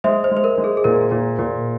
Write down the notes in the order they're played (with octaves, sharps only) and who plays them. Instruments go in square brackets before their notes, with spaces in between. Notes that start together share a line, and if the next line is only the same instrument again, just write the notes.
[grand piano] G#3 [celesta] C5 E5
[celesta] C5
[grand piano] G#3
[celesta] C5
A#4
[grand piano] G#3
[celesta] G#4
G#4
[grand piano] A#2 [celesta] A#4
[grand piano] A#2
A#2